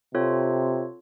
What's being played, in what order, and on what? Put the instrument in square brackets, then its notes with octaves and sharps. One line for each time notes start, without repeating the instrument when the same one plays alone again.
[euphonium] C3 [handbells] C4 F4 A4 C#5